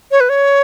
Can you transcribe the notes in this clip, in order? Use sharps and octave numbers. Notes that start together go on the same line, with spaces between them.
C#5
B4
C#5